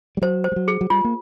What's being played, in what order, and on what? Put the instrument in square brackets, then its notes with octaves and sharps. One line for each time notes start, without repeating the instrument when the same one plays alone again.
[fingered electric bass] G3
[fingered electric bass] F#3 [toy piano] C5
[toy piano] C5
[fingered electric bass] G3
F#3
[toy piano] G#4
[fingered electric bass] F#3
[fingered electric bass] G3 [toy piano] F4
[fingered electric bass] A#3